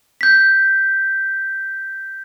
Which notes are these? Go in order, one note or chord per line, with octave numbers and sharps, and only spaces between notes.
G6 B6